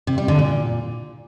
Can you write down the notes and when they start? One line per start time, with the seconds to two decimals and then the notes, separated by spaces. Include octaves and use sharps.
0.07 C3
0.18 G3
0.28 D3
0.39 A#2